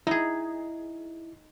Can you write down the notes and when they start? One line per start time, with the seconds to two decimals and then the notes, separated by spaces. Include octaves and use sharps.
0.07 D#4 E4 G#4